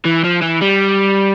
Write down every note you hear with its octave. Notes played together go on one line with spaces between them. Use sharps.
E3
F3
E3
G3